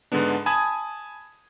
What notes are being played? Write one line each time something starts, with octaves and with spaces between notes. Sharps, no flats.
G#2 D3 G#3 B3 D4
G#5 A5 B5 D#6 G#6